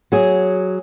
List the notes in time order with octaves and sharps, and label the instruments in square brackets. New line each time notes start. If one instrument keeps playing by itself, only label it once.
[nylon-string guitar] F#3 G#4